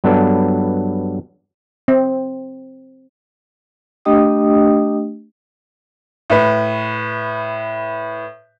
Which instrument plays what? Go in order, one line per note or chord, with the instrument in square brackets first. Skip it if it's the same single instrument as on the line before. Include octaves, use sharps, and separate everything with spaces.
[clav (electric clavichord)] G2 F#3 B3 D4 A4
[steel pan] C4
[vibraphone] A3 D4 G4 D#5 G5 D#6
[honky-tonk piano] A2 B4